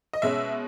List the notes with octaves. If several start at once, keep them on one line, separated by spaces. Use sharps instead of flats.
D#5
B2 G#3 C#4 E5